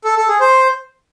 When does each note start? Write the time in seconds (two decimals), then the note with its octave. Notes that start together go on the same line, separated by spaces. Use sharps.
0.04 A4
0.16 A4
0.28 G#4
0.40 C5